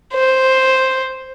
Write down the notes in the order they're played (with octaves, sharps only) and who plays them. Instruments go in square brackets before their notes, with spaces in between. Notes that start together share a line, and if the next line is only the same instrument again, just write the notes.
[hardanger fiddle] C5